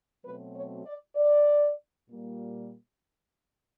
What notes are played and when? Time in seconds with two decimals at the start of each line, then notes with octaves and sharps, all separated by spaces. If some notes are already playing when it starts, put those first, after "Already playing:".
0.24 B2 F#3 A3 C4 B4
0.55 C#5
0.86 D5
1.16 D5
2.09 A#2 G3 A#3